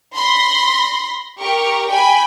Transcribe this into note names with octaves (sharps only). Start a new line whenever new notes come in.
B5 C6 A#6
G4 A#4 C#6
G5 G#5 B5